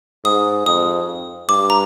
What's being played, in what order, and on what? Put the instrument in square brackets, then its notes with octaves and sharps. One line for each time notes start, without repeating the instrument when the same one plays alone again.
[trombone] G#2 [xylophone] D#6
[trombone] F2 [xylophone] D#6
[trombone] G2 [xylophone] D6
[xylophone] A#5